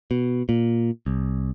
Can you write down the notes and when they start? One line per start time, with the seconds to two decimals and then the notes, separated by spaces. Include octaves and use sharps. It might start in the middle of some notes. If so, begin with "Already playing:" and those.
0.11 B2
0.49 A#2
1.06 C2